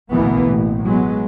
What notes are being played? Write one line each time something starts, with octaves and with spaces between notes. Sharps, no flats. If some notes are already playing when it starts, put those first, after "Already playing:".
A1 D2 B2 E3 A#3 B3
A1
F#3 G#3 B3